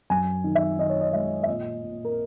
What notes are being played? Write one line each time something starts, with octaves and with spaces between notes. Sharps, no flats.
F#2 G#5
D#3
E5
D#3 D#5
C#5
D#5
G#3 E5
E5
A#2 D#5
A#2
A#4